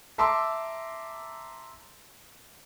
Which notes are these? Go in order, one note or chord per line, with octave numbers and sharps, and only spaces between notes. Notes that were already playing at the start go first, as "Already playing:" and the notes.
E5 A5 A#5 C6 D6 E6